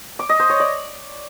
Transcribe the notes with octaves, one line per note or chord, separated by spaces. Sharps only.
D6
D#5
C5
C#5
D5